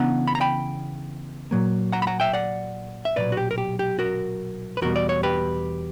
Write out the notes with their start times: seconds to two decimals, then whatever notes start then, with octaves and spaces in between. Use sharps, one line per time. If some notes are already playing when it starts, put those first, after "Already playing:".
Already playing: C#3 E3 B3 D4 F#5 A#5
0.28 B5
0.35 A#5
0.41 G5 B5
1.51 A#2 F#3 A#3
1.92 F#5 A#5
2.02 B5
2.07 F#5 A#5
2.20 E5 G5
2.33 D5 F#5
3.05 E5
3.16 B1 A#2 F#3 B4 D5
3.32 F#4
3.37 G4
3.51 A#4
3.58 G4
3.79 G4
3.99 F#4 A#4
4.77 B4
4.81 E2 B2 G3 F#4 A#4
4.96 D5
5.09 C#5
5.23 G4 B4